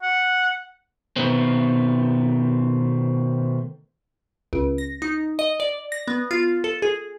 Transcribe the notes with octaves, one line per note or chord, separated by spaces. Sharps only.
F#5
B2 D#3 A3 B3 C4
C#2
A#6
D#4
D#5
D5
A#6
B3
F4
A4
G#4